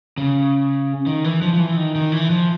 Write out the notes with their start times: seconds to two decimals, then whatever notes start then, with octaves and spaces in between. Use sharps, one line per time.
0.18 C#3
1.06 D#3
1.24 E3
1.42 F3
1.53 F3
1.60 E3
1.77 D#3
1.95 D#3
2.12 E3
2.30 F3